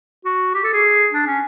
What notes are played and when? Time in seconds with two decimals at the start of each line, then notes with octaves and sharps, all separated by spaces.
0.25 F#4
0.54 G4
0.64 A4
0.73 G#4
1.12 D4
1.26 C#4